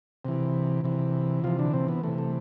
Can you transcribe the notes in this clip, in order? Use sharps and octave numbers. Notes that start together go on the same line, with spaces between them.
C3 E3
C3 E3
C3 E3 F3 F4
D3 D4
C3 C4
B3
C3 E3 A3
A3